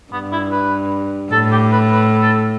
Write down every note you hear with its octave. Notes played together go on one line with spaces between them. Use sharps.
G2 B3
E4
B4
A2 A4
G4
B4
B4
A4